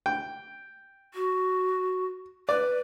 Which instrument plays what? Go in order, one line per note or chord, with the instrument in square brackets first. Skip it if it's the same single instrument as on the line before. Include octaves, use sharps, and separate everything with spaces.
[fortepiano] G5
[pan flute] F#4
[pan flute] B4 [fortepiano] D5